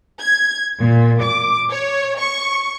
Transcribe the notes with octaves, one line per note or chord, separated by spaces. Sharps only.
G#6
A#2
D6
C#5
C#6